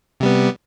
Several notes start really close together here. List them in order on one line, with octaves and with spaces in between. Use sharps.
C3 G3 B3